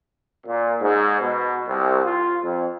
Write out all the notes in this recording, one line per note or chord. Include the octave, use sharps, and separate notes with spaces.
A#2
G#2
B2
C2
F4
F2